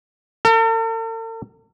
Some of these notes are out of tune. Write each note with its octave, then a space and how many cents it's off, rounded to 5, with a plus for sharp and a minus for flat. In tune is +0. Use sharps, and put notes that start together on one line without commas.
A4 +45